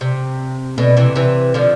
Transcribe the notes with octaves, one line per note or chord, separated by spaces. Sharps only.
C3
B2 D3
C3 E3
C3 E3
D3 F3